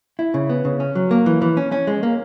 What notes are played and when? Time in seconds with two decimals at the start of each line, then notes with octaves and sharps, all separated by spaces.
0.19 E4
0.34 C#3
0.49 B3
0.65 C#3
0.80 C#4
0.95 F#3
1.11 A#3
1.26 E3
1.42 E3
1.57 C#4
1.72 C#4
1.87 G#3
2.03 A#3